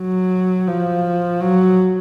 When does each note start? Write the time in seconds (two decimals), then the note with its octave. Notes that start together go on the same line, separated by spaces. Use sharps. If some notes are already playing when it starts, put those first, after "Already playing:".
Already playing: F#3
0.67 F3
1.40 F#3